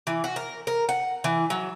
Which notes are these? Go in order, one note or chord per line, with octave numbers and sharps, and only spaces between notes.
E3
F#4
A#4
A#4
F#5
E3
F#3